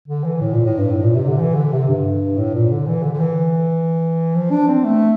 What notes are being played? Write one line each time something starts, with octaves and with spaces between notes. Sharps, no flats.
D3
E3
A2
A#2
A2
G2
A2
A#2
C3
D3
E3
D3
C3
G2
A2
A#2
D3
E3
D3
D3
E3
F3
D4
C4
A3